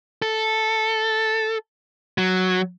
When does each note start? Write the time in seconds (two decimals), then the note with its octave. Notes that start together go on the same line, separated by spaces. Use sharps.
0.22 A4
2.18 F#3